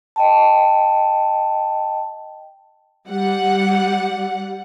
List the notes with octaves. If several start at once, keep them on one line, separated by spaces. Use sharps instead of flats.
D#5 G5 A5
G3 F#5